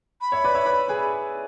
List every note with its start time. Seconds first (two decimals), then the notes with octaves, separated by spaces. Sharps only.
0.21 B5
0.32 C#5 E5
0.44 B4 D5
0.55 C#5 E5
0.66 B4 D5
0.88 G#4 B4